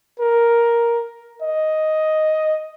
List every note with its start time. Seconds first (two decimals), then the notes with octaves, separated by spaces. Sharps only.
0.19 A#4
1.42 D#5